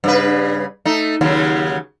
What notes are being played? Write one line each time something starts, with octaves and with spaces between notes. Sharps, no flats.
G2 C#3 B4
A3 D#4
D#2 C#3 F#3